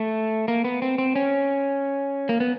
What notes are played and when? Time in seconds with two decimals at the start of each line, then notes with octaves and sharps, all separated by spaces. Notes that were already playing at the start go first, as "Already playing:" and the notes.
Already playing: A3
0.48 A#3
0.64 B3
0.82 C4
0.98 C4
1.15 C#4
2.29 A#3
2.40 B3